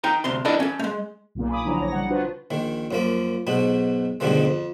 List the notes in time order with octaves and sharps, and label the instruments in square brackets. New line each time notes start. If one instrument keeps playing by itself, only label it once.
[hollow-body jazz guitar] D#4 G5 A#5
D2 C3 C6
D4 E4 A4 A#4 D5 D#5
C#4 A4
G#3 A3
[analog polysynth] B1 A#2 C#3 A#3
G#5 B5 D6 D#6
D3 F3 F#3 D4 E4 A#5
A#1 C#5 A#6
C#3 G3 F#5
D4 F4 F#4 B4 C5
[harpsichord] A#1 D#3
F#2 F3 A#3
B1 G#2 B2 B3
D2 G2 B2 D#3 F3 G#3
F2